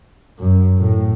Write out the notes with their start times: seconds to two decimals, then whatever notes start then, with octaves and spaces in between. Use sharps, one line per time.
0.39 F#2
0.78 A2